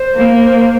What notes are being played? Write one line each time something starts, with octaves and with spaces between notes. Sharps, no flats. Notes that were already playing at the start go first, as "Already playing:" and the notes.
Already playing: C5
A#3
C5
C5